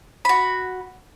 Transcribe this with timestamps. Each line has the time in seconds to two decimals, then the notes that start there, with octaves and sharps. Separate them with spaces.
0.25 F#4 B5